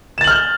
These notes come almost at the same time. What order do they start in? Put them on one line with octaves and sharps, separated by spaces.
E7 A6 F#7 F6 G6